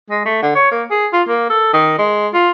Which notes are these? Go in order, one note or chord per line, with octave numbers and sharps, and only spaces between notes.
G#3
A3
D3
C#5
A#3
G#4
F4
A#3
A4
D#3
G#3
F4